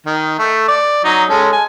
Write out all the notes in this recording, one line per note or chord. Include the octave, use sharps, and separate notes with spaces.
D#3
A3
D5
F#3 D#4
G#3 C#4 A4
G#5